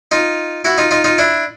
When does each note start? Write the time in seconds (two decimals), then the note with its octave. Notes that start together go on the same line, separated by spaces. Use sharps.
0.11 D#4 F4
0.65 E4 F#4
0.78 D#4 F4
0.91 D#4 F4
1.04 D#4 F4
1.18 D4 E4